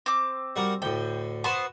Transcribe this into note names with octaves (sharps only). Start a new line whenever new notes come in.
C4 D6
G3 F#4 A#4
D2 A2 G5
B3 F#4 B4 C5